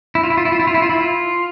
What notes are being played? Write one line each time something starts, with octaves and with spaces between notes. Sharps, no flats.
E4
F4
E4
F4
E4
F4
E4
F4
E4
F4
E4
F4